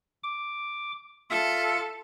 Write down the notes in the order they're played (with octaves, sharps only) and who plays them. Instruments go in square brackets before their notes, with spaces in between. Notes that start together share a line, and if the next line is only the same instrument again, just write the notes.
[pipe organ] D6
[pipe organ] F4 E5 [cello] A4